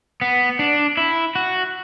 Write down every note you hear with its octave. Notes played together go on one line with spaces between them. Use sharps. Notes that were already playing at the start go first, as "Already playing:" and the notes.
B3
D4
E4
F#4